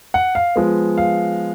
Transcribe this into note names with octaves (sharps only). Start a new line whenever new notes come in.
F#5
F5
F3 G#3 B3
F5